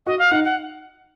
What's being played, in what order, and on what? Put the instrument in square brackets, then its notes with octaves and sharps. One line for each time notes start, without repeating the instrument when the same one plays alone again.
[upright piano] F#4 [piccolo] D#5
[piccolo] F5
[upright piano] D#4 [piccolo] F#5
[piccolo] F#5